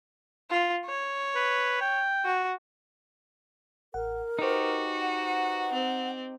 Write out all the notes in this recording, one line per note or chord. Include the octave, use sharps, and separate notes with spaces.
F4
C#5
B4
G5
F#4
A1 A#4 F#5
D#4 F#4 G4 B4 C5
F#5
C4